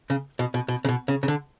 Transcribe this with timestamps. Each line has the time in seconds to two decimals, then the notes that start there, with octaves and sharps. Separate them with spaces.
0.10 C#3
0.39 B2
0.54 B2
0.68 B2
0.85 C#3
0.88 B2
1.08 C#3
1.23 C#3
1.28 D3